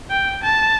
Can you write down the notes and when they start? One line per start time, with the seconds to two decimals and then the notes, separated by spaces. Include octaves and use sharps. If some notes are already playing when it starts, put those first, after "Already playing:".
0.11 G5
0.43 A5